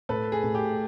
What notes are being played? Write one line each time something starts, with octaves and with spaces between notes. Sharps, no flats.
A2 A4 B4
G#4
A2
G4